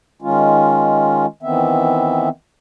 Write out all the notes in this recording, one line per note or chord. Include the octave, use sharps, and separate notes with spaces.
D#3 G#3 C#4 F4
D#3 E3 B3 C4 E5